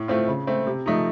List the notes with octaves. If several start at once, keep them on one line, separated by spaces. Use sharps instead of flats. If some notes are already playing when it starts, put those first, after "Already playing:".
Already playing: A2
A3 C4 F4
C#3
A3 C4
C3
F3 A3 D#4